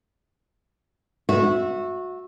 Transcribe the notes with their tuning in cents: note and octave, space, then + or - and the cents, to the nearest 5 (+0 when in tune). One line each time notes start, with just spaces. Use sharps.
F#4 -25 E5 +0